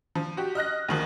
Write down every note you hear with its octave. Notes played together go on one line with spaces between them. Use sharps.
F3
F#4 G4
D#5 F6 F#6 A#6
D2 D#3 F3